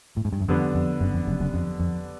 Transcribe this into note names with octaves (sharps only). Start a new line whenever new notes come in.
A2
G#2
G2
F#2
F2 D3 G3 B3 D4
F2
F#1 F#2
F2
F#1 F#2
F#1 F#2
F2
F2